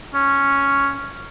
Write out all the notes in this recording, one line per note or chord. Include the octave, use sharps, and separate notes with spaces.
C#4